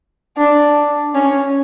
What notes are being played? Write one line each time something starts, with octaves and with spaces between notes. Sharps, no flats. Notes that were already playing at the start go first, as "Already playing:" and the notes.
D4
C#4